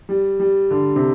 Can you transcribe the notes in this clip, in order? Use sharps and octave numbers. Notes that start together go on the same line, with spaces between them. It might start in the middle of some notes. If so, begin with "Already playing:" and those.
G3
G3
D3
C3